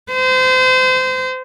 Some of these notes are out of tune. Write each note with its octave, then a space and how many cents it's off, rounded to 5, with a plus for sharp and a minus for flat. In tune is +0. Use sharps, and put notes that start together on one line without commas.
C5 -30